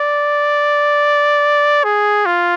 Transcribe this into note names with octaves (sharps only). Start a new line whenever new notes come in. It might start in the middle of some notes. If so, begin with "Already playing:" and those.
Already playing: D5
G#4
F4